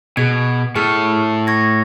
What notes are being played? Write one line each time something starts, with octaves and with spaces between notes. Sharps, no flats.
B2 G#4 G#6
A2 G#4 A4 C#6 F6
C#6 G#6 A#6